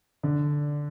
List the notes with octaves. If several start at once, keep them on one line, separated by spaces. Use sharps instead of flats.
D3